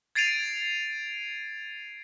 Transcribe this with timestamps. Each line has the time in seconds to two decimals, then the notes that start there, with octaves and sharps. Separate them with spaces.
0.15 G#6 A6 C7 D7 D#7 F7